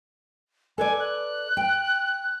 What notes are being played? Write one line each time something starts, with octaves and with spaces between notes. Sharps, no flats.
A4 B4 D5 G#5
F#6
G5